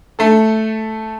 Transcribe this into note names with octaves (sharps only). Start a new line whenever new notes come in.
A3 A4